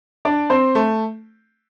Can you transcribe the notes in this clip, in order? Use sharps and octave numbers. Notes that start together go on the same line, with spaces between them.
D4 D5
C4 C5
A3